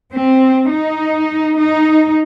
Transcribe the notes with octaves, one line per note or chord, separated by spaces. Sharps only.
C4
D#4
D#4